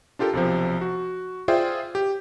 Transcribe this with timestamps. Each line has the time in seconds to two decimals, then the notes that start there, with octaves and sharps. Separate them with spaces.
0.19 D4 F4 G4 A4 A#4
0.33 B1 C3 F3
0.81 F#4
1.48 F4 G#4 C5 D5 E5 G5
1.95 G4